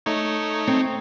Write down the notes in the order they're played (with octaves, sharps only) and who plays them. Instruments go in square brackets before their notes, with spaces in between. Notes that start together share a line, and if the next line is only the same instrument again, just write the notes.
[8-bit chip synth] A3 D#4 C#5
[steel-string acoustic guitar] C4